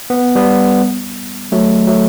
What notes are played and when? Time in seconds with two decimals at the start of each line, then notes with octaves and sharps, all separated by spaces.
0.10 B3
0.35 G3 B3
1.52 F#3 A3
1.87 F#3 A3